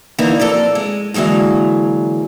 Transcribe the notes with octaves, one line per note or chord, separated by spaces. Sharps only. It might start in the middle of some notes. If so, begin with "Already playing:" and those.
D3 E3 A#3 D#4
F2 A4 A#4 D5
G#3
D3 E3 F#3 G#3 A#3